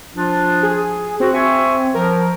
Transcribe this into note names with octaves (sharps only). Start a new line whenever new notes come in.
F3 D4 F4
G#4
C4 F#4
E5 G#5 C#6
F3 A#4